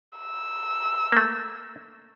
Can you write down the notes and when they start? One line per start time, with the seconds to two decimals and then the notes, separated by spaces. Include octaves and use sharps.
0.18 E6
1.12 A3 A#3